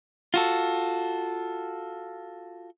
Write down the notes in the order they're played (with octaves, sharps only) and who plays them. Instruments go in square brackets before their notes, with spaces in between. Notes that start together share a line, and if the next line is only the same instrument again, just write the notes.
[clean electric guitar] F4 F#4 A4